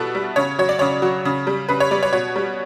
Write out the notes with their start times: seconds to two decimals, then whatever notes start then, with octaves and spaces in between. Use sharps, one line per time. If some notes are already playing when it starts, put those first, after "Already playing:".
Already playing: B2 G3 B3 E4 A4
0.15 G3
0.36 C#3 C#5
0.59 F#3 C#5
0.69 D5
0.79 C#3 C#5
1.02 F#3
1.25 C#3
1.47 G3
1.69 C#3 B4
1.80 C#5
1.91 G3 D5
2.03 C#5
2.13 B2 C#5
2.36 G3